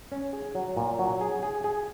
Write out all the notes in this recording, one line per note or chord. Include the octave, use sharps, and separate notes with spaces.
C#4
G#4
F#3
A#2
F#3
G#4
G#4
G#4